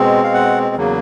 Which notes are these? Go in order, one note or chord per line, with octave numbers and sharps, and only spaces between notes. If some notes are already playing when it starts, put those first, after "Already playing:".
Already playing: B2 G#3 C4
F5
F#5
E2 C#3 F#3 A#3